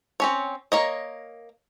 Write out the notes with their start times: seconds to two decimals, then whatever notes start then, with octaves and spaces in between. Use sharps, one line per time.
0.20 C4 C#4 C#5
0.72 A#3 C#5 D#5